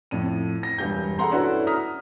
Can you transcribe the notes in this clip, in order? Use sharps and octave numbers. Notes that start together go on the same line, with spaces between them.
F2 A2 D#7
A#6
E1 G2 G4 G6
G#4 A4 F#5 A#5 C6
C#4 D4 E4 F#4 A4 B4
A#5 D#6 F6 B6